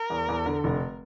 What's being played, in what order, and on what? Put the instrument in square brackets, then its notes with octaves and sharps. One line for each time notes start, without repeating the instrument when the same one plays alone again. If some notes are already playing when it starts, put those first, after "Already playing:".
Already playing: [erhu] A#4
[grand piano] E2
E2
D3
F1